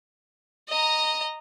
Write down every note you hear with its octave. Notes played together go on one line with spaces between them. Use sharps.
D#5 A#5